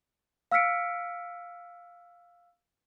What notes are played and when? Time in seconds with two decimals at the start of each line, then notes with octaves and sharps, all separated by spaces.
0.51 F5 E6 F6 B6 C#7 D7